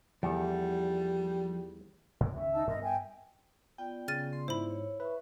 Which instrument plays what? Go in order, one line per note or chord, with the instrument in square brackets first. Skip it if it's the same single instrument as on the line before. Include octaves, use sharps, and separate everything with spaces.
[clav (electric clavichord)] E2 [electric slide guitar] F3 A4 [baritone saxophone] G3
[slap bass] G#2 D3 E3
[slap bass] C#2 D#3 C#4 [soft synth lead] E5
[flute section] D#4 A5 E6
[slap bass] G2 B3 [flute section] A#4 D#5
[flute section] E5 G5 G#5
[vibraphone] B3 F4 D5 [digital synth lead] G5
[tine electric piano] C#3 [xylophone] F6 A6 D#7
[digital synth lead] C6
[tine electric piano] G#2 [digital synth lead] E4 [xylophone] C5 B5
[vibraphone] C#5
[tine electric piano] B4 [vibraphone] E5 C#6